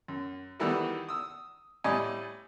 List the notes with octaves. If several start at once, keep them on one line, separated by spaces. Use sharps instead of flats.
F#2
D#3 E3 G3 A3 E4 F#4
D#6 E6
A2 G3 D5 D#5 G#5